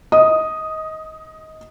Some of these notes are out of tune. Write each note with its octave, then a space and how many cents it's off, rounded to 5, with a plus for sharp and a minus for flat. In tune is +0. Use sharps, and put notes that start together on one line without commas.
D#5 +20 D#6 +0